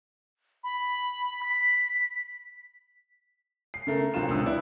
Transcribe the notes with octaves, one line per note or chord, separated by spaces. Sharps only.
B5
B6
C7
C#3 A3 A#4
C2 F#3 C4 D4 F4 E7
C#2 D3 F#3 C4 D#6 E6
E4 B4 D5